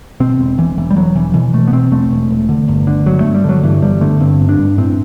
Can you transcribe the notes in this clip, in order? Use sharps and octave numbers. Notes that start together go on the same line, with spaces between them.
B2 C4
E1
E1 E3
E1 E3
G3
E1 F#3
E1 E3
B2 E3
B2 A3
B3
B2 C4
E1 A3
E1
E1
D3
G1
D3
G1 F#3
G1 A3
G3
D3 F#3
G2 E3
G1 G3
D3 A3
G2 C4
G1
D4
G2
A2 C4